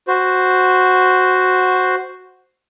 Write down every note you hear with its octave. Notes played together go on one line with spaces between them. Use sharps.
F#4 C5